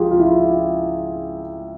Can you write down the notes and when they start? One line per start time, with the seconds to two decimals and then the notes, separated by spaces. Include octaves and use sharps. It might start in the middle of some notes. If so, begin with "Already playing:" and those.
Already playing: C#2 F3 F4 G4 G#4
0.11 F4
0.20 E4